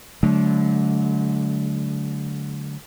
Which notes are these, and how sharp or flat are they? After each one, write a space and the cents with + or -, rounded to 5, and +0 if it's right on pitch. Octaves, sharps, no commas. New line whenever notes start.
D3 -15 F#3 +0 A3 -40